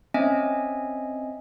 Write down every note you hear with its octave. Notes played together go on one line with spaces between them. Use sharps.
C4 C#4 D#5 E5 G#5